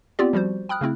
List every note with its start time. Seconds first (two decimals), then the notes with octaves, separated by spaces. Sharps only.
0.19 B3 C4 F4 G4 D5
0.33 F3 G3 F#4 C5
0.69 G5 B5 D#6 F6 F#6
0.81 C#3 A3 C4 E4